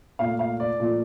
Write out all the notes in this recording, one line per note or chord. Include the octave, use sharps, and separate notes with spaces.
A#2 A3 F5
F5
D5
A#2 F3 A3